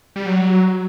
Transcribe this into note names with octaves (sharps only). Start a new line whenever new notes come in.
G3
F#3